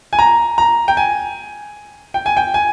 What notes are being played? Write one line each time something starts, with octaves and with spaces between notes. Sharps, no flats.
G#5
A#5
A#5
G5
G#5
G5
G#5
G5
G#5